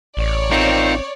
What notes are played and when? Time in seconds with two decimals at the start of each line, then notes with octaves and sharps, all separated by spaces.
0.17 A1 C#5 D5
0.51 C4 D#4 F4 A#4